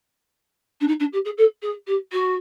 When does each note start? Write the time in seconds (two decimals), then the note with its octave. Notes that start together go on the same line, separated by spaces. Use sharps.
0.80 D4
0.87 D#4
0.99 D4
1.12 G4
1.25 G#4
1.37 A4
1.62 G#4
1.87 G4
2.12 F#4